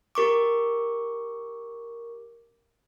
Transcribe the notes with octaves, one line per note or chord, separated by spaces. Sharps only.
G4 A#4 C#6 D6